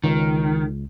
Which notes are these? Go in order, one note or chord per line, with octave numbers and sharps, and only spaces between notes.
C#2 D#3